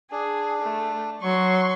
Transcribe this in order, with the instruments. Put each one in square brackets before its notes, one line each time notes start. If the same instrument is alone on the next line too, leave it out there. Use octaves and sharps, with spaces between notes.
[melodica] D4 [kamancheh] G#4
[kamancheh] A3
[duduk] F#3 [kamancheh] C6 C#6